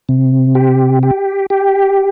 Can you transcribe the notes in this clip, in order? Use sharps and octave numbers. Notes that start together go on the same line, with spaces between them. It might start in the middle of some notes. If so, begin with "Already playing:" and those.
C3
G4
G4
G4